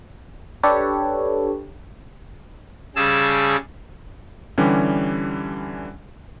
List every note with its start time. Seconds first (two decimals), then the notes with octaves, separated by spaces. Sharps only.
0.63 D4 G4 A4 B4 C#5
2.96 C#3 G3 G#4 A5 E6
4.58 D3 E3 G3 C#4 G4